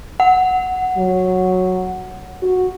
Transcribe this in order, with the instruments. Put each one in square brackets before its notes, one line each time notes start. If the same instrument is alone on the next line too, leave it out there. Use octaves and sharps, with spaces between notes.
[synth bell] F#5
[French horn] F#3
F#4